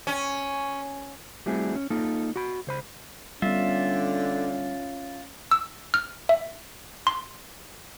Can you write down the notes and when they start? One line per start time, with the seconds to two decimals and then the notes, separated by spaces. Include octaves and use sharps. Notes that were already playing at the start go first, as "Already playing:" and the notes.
0.07 C#4
1.46 G3 A3 C4 E4 F#4 G#4
1.76 C#4
1.90 A#3 D#4 F4 A4
2.36 F#4 B5
2.67 C#2 C5 B5
3.42 D3 G3 B3 C#4 F4 E5
5.51 E6
5.94 F6
6.29 E5
7.07 C6